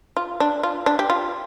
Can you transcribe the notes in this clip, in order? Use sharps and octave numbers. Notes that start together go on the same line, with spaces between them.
F4
D4
F4
D4
G4
F4